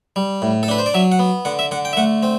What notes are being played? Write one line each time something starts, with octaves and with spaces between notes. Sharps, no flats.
G3
A2
A4
D4 B4
C5
D5
F#3 E5
F#5
B3
D3 F#5
E5
D3 F#5
G5
E5
A3 F#5
C4